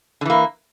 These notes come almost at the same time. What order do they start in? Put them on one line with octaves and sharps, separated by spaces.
D3 E3 A#3